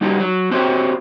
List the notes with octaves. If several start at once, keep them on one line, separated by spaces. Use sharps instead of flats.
G3 D#4 F#4 G4
F#3
C4 F#4 G4 C5 C#5